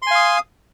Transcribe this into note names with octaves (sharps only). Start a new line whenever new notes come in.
F5 G#5 C6 D#6